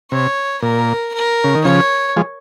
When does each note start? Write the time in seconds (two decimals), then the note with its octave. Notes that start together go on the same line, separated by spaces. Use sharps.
0.12 C3 C#5
0.62 A#2 A#4
1.14 A#4
1.44 C#3
1.55 D#3
1.65 C#3 F3 C#5
2.16 F3 G#3